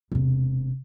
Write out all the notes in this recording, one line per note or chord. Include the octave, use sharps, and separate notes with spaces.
E1 C3